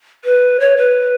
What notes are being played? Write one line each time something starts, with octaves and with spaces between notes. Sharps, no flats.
B4
C#5
B4